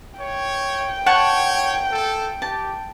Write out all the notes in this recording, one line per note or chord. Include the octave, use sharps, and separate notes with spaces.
C#5 G5
C#5 F#5 A5 C#6
A4
G4 A5